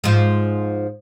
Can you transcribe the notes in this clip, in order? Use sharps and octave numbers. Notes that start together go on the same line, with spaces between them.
G#2 F3